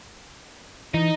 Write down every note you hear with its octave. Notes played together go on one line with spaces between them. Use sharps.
E3 D#4